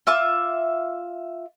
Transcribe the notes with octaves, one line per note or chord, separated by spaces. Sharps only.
F4 E5 D6